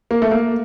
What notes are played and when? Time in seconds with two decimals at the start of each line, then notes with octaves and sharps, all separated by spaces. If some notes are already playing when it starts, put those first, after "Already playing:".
0.11 A#3
0.22 A3
0.31 A#3